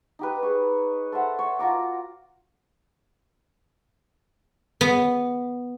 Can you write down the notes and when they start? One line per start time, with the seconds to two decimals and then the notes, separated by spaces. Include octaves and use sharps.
0.19 D#4 G4 B4
0.43 G#4 C#5
1.12 A4 C5 E5 F#5
1.39 C#5 E5
1.59 F4 F#4 A#5 D6
4.81 B3